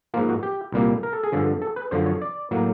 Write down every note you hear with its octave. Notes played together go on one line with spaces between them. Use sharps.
G#2 F3 A#3 F4
F#4
G4
C2 A#2 G3 A#3
A#4
A4
G#4
G2 D3 F3 A4
A4
B4
F#2 D3 F3 C5
C#5
D5
A2 F#3 A#3